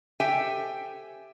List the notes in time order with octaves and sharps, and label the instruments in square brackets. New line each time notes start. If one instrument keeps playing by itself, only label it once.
[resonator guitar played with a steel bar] G4 A4 C5 E5 G5 G#5